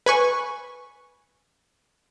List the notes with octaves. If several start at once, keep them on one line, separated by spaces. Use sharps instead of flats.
B4 G#5 C#6